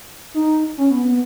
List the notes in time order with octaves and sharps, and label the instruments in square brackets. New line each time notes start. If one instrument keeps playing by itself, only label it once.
[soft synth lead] D#4
C#4
B3
B3